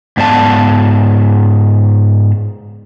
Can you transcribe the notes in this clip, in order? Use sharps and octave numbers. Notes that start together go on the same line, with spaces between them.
G#2 B3 C5 D5 F5 A5